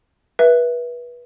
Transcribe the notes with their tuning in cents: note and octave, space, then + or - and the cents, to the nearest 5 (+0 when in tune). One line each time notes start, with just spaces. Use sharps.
B4 -25 E5 +0